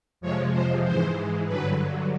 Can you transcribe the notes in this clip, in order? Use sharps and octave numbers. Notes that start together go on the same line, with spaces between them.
F2 C3 F3 G#3 C#5
C5
G#2 E3 G#3 C5
G2 D3 F#3 B4